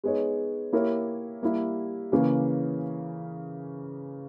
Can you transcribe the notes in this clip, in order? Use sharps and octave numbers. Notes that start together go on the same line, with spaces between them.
G#3 B3 D#4 G#4 C#5
A#3 E4 G4 A#4 C#5
G3 A#3 E4
C#3 E3 A#3 C#4 G#4